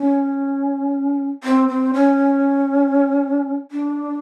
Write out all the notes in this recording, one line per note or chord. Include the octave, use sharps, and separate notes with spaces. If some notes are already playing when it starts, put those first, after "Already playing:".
Already playing: C#4
C4
C4
C#4
D4